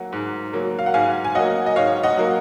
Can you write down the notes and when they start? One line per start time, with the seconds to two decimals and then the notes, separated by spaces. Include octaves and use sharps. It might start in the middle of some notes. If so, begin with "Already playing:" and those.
Already playing: F#3 A#3 F#5
0.12 G#2
0.53 F#3 A#3
0.79 F5
0.86 F#5
0.94 G#2 F5 G#5
1.25 G#5
1.35 F#3 A#3 D#5 F#5
1.66 D#5
1.76 G#2 C#5 F5
2.03 D#5 F#5
2.17 F#3 A#3